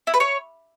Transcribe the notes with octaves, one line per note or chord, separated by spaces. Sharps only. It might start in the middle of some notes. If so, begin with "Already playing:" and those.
E4
B4
C#5